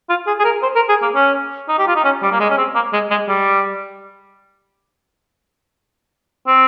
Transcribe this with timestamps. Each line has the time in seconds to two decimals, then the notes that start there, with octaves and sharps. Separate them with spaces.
0.09 F4
0.27 G#4
0.39 G#4
0.44 A#4
0.63 C5
0.75 A#4
0.89 G#4
1.02 A#3
1.15 C#4
1.68 D#4
1.78 G4
1.87 F4
1.96 D#4
2.04 C#4
2.22 G3
2.32 A#3
2.40 G#3
2.50 C#4
2.57 C4
2.75 A#3
2.93 G#3
3.10 G#3
3.28 G3
6.47 C4